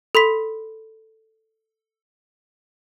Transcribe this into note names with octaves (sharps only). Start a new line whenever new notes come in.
A4 B5 C6 B6